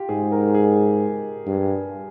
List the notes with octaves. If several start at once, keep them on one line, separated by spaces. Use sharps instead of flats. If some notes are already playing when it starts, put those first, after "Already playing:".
Already playing: F4 G4
G#2 G#4
A#4
G#4
G2